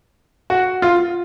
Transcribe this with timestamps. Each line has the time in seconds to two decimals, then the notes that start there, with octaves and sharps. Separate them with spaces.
0.50 F#4
0.82 F4